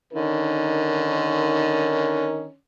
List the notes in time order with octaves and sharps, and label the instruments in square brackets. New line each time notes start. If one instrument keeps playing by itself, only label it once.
[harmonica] D3 C#4 [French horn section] D#3 D#4 A#4